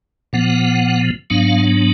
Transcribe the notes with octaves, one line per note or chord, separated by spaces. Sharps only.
A#2 F3 B3 F#5
G#2 F#3 B3 D4 F5